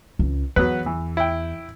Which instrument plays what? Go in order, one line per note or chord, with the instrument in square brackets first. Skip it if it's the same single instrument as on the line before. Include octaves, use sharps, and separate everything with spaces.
[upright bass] C#2
[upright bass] E2 [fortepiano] F#3 B3 B4
[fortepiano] E3
E4 G5